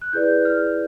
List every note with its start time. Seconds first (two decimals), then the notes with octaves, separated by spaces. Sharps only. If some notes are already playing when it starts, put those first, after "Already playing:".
0.02 F#6
0.13 E4 G#4 B4 D5 G6
0.45 F6